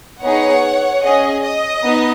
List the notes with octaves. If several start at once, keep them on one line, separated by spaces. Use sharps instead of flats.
B3 D#4 G#4 C#5 F#5
C#4 G#4 D#5
D#5
B3 D#4